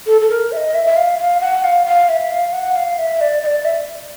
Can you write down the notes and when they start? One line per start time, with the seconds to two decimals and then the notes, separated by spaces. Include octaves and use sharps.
0.07 A4
0.21 A4
0.29 A#4
0.52 E5
0.57 D#5
0.75 E5
0.87 E5
0.97 F5
1.19 F5
1.41 F#5
1.64 F5
1.86 F5
2.09 E5
2.31 F5
2.53 F#5
2.76 F5
2.98 E5
3.21 D5
3.43 D#5
3.47 D5
3.65 E5